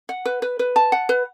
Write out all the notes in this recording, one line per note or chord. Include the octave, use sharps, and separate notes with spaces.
F#5
B4
B4
B4
A5
F#5
B4